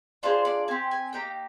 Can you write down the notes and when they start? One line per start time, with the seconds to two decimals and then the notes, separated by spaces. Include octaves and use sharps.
0.23 D4 F4 G#4 C5
0.45 D5
0.68 C4 G4 G#5
0.91 G#5
1.13 A#3 D#4 G4 G5